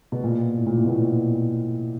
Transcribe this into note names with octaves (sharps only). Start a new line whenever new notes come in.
B2
A#2
A2
A#2
A2
B2
A#2